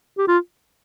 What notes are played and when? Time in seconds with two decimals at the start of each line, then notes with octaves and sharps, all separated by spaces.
0.18 G4
0.28 F4